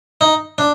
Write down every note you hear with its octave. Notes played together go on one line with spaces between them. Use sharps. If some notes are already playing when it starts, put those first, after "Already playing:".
D#4
D4